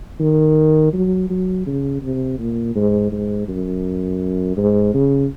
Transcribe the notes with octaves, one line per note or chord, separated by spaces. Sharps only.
D#3
F#3
F#3
C#3
C3
A#2
G#2
G#2
F#2
G#2
C#3